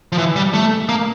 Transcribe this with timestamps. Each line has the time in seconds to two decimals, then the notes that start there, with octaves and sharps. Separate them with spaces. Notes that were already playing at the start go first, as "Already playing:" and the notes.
0.12 F3
0.18 E3
0.36 G3
0.54 A3
0.89 A#3